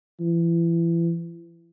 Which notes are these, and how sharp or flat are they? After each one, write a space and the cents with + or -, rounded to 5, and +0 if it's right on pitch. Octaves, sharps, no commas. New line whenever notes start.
E3 +30